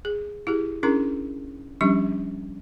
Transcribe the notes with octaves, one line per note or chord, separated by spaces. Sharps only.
G#4
E4 G4 G#4
C#4 D4 E4 G#4 A#4 A#5
F3 G3 C#4 D4 G4 C#6